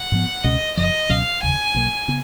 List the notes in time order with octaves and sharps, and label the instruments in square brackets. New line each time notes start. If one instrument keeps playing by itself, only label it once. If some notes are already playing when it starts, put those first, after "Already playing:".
Already playing: [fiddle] F#5
[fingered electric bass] G#2 F3 B3
[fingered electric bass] C#2 B2 G#3 C#4 [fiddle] D#5
[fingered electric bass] F#1 F#2 F3 [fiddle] D#5
[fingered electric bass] C#2 B2 F#3 C#4 [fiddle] F5
[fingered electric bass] F1 D#2 C#3 [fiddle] G#5
[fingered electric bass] B1 B2 F#3 A#3
C#3 B3